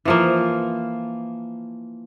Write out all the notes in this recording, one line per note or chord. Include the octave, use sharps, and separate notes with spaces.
E3 F3 A#3